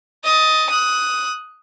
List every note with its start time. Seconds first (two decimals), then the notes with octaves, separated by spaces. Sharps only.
0.24 D#5 A6
0.70 D#6 F#6